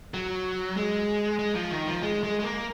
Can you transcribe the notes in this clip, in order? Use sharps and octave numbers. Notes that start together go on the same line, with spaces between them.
F#3
G#3
G#3
F3
D#3
F3
G#3
G#3
G#3
A#3